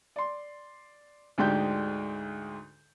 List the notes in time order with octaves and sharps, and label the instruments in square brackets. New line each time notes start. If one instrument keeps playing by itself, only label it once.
[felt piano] D5 C6
D2 G#2 G#3 D4 G4 G6